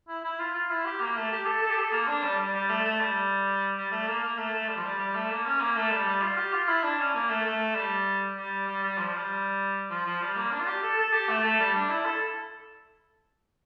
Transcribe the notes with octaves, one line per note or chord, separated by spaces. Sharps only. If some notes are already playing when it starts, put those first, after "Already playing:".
E4
E4
F4
F4
E4
G4
A#3
A3
G4
A4
A4
G4
A4
A#3
D4
G3
G3
G3
A3
A3
G3
G3
A3
A#3
A#3
A3
A3
G3
F3
G3
G3
A3
A#3
C#4
A#3
A3
G3
G3
F4
G4
F4
E4
D4
C#4
A#3
A3
A3
G3
G3
G3
G3
F3
G3
F3
F3
G3
A#3
D4
F4
G4
A4
A4
G4
A3
A3
G3
D4
E4
A4